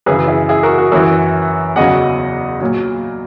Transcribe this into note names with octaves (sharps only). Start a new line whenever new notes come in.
F#2 C#3 E3 G#4 B4
E4 G#4
E4 G#4
F#4 A#4
F#4 A#4
F#2 E3 F#4 A#4
E2 C#3 F#3 D#5 F#5
A#2 F#3